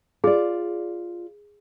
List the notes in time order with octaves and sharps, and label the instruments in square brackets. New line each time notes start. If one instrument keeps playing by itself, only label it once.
[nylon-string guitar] F4 D5 [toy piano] G#4